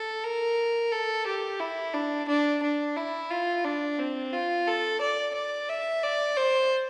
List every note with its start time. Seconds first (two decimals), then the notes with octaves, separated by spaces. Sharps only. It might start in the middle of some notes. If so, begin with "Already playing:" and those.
Already playing: A4
0.24 A#4
0.92 A4
1.26 G4
1.60 E4
1.94 D4
2.28 D4
2.63 D4
2.97 E4
3.30 F4
3.65 D4
3.99 C4
4.33 F4
4.67 A4
5.01 D5
5.35 D5
5.69 E5
6.03 D5
6.37 C5